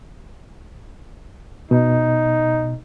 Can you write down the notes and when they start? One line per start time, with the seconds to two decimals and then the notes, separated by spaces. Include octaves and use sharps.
1.71 B2 D#4